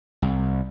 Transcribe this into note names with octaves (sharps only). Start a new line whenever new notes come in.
C2